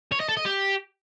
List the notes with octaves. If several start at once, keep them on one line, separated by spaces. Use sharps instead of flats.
C#5
D#5
A4
D#5
G4